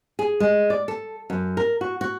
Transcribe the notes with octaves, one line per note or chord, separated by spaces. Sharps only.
G#4
G#3
D5
A4
F#2
A#4
F#4
F#4